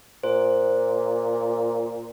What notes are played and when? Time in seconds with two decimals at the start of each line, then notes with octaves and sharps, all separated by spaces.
0.24 A#2 C5